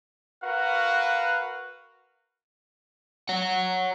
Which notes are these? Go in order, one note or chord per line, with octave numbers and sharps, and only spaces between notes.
F#4 A#4 B4 F5 F#5
C#5 F#5